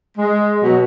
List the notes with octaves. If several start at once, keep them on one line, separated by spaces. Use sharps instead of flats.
G#3
B2 F#3